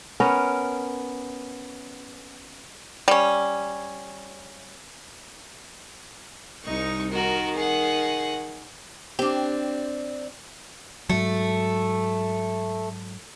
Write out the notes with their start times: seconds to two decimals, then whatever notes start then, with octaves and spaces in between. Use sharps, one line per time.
0.20 B3 C#4 A#4
3.08 G3 C#4
6.65 C2 D#4 C#6
7.12 D#3 F#4 A#4
7.56 G#4 F#5
9.19 C4 D4 G4
11.10 G#2 F#3 A3